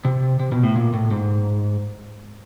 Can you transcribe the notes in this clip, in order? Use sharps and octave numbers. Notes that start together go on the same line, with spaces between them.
C3
C3
B2
A2
A#2
A2
G#2